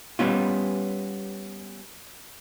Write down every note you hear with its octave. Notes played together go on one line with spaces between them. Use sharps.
G3 B3 C#4 F4